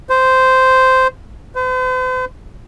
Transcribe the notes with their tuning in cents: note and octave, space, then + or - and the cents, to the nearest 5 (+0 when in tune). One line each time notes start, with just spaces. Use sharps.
C5 -10
C5 -45